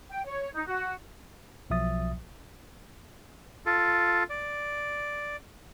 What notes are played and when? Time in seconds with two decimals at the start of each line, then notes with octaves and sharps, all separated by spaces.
0.09 G5
0.25 C#5
0.55 D#4
0.67 F#4
1.70 B1 F3 F#3 E5 D#6 A6
3.66 F4 A4
4.30 D5